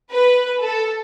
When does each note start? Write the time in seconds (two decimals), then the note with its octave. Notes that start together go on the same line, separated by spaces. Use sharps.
0.11 B4
0.61 A4